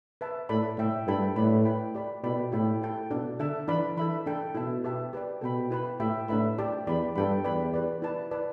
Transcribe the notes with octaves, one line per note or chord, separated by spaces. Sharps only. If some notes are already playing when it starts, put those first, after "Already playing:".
B4 E5 A5
A2 A4 D5 B5
A2 A4 E5 G5
G2 E4 A4 G5 B5
A2 B4 D5 B5
B4 G5 B5
G4 D5 B5
B2 E4 A4 D5 G5 B5
A2 E4 G4 E5 G5 B5
E4 A4 G5
B2 D4 A4 D5
D3 A4 E5 A5
E3 D4 B4 D5 B5
E3 A4 E5 B5
D4 A4 G5
B2 E4 A4 E5 A5
G4 B4 E5 A5
G4 B4 D5
B2 A4 G5 B5
E4 B4 G5 B5
A2 G4 E5 G5 B5
A2 D4 B4 E5 B5
G4 D5 A5
E2 G4 D5 B5
G2 A4 G5 B5
E2 B4 D5 G5 B5
G4 B4 D5
E4 B4 D5 A5
E4 B4 D5 A5